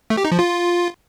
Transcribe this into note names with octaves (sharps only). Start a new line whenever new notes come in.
A3
G4
D#4
F3
F4